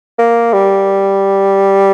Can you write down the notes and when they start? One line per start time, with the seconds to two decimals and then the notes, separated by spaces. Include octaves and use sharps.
0.19 A#3
0.53 G3